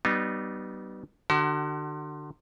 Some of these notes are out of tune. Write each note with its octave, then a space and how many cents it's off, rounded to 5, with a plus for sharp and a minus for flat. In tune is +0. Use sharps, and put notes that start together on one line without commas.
G3 -30 B3 +0 D#4 -30
D3 +35 F#4 +40